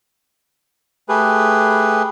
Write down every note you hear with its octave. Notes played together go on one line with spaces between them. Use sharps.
A3 G4 G#4 B4